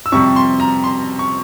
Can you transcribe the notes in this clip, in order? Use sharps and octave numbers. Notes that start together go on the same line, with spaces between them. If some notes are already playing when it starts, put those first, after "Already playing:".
E6
F2 C3 G3 C#6
C6
A#5
C6
C#6